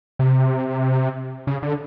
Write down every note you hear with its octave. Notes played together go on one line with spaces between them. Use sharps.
C3
C#3
D3